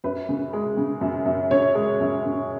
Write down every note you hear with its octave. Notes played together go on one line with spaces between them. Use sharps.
F#2 B4
C#3
G#3
C#3
F#2
F#2
C#3 C#5
G#3
F#2
C#3